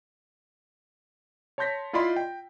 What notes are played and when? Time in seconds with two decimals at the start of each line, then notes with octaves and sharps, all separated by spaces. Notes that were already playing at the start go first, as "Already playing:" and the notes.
1.58 C#5 A5 C6 G6 A#6 B6
1.93 E4 F4 D5 D#5 B5 C6
2.16 G5